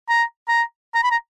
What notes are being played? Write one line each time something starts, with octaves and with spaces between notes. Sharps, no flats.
A#5
A#5
A#5
B5
A#5